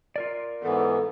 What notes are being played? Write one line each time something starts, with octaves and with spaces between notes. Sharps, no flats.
F4 A#4 D5
G#2 E3 B3 A4